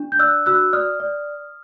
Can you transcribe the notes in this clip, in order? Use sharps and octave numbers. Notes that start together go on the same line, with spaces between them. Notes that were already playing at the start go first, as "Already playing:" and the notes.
Already playing: D4
G6
D5 E6 F#6
F#4 E6 F#6
D5 D#6 F6
D5